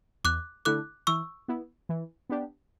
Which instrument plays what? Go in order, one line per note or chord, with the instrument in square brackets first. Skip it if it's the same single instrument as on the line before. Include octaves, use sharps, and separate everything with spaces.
[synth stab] E2 [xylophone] D6 F#6
[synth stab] D3 A3 E4 A4 [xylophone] D6 F#6
[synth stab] E3 [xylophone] C#6 E6
[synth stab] B3 E4
E3
B3 D4 G4